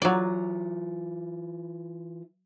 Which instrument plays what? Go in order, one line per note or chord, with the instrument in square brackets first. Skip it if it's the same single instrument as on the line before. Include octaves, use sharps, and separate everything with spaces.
[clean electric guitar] E3 F4 A#5 [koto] F#3 D5